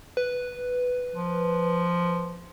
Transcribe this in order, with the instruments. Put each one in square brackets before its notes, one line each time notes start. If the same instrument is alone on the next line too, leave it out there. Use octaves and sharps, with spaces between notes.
[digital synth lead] B4
[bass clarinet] F3